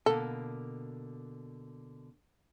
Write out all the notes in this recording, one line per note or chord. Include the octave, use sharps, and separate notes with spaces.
B2 D3 A#3 A4